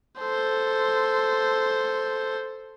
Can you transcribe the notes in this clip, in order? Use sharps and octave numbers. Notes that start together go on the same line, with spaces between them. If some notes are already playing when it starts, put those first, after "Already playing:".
A4 C5